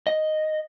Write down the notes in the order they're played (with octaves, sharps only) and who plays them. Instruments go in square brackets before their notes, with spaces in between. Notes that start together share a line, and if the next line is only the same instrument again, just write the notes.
[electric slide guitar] D#5